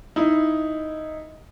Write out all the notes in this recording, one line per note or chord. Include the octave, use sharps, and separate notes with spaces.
D#4 E4